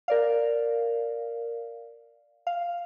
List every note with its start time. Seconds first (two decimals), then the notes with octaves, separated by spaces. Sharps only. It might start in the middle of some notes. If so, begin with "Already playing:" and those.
0.08 A#4 D5 F5
2.47 F5